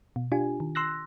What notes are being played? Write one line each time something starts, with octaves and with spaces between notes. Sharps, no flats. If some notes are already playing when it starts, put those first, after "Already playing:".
B2
D4 F4 G4 G#5
D#3
C6 E6 F#6 A#6